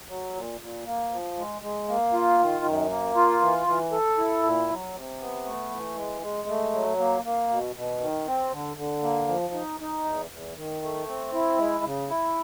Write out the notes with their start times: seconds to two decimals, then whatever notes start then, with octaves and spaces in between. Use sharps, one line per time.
0.09 F#3
0.35 A#2
0.61 A#2
0.85 A#3
1.11 F3
1.37 G#3
1.62 G#3
1.88 A#3
2.13 F4
2.39 D#3
2.65 F#2
2.90 A#3
3.16 F4
3.41 E3
3.67 E3
3.92 A4
4.18 E4
4.43 A#2
4.69 F#3
4.94 C3
5.20 B3
5.45 A3
5.71 E3
5.97 G#3
6.22 G#3
6.48 A3
6.73 F#3
6.99 A#3
7.25 A#3
7.50 B2
7.76 B2
8.00 D#3
8.26 C4
8.51 D3
8.77 D3
9.02 A#3
9.28 F3
9.54 D#4
9.80 D#4
10.05 E2
10.30 E2
10.56 D#3
10.82 A3
11.07 C4
11.33 E4
11.58 G#3
11.85 C#3
12.10 E4